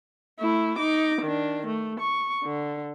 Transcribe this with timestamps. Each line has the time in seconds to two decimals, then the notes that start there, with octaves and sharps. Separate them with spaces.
0.39 A3 E4
0.78 D#4 D6
1.21 D#3 D4
1.66 A3
2.00 C#6
2.44 D3